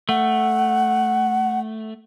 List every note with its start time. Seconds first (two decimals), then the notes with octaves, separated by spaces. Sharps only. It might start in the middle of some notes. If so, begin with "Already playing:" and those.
0.09 A3 F#5